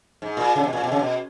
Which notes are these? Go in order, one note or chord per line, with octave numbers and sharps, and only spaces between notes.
G#2
A#2
C#3
B2
A#2
B2
C#3
B2